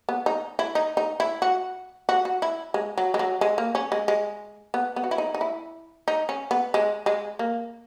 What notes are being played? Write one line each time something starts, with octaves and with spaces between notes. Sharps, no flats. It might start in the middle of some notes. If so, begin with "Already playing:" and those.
B3
D#4
E4
D#4
D#4
E4
F#4
F#4
F#4
E4
G#3
F#3
G#3
F#3
G#3
A#3
C#4
G#3
G#3
B3
B3
F#4
E4
D#4
D#4
E4
D#4
C#4
B3
G#3
G#3
A#3